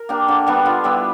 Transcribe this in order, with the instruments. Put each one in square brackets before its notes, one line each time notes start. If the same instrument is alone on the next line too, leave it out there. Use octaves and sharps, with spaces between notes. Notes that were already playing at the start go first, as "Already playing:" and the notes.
Already playing: [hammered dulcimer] A#4
A#3 D4 G4
D3
G3 B3 D4
D3 F4
G3 B3 D4 E4